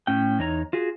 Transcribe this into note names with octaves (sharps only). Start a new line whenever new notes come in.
A2 C#4 G5
E2 D#4 C#5 A#5
F4 F#4 G#4